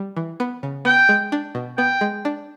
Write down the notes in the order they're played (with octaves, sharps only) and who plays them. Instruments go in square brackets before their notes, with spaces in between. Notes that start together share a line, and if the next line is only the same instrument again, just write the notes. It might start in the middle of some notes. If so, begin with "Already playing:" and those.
Already playing: [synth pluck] G3
E3
B3
C#3
[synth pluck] B3 [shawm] G5
[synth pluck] G#3
D4
B2
[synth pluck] B3 [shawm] G5
[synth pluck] G#3
D4